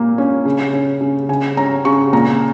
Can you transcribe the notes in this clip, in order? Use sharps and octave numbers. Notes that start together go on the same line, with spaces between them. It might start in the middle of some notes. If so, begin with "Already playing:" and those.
Already playing: A#2 A#3
C#4
C#3
C#4
C#3
C#3 G#5
C#4 A#5
C#3 C#6
A#2 A#5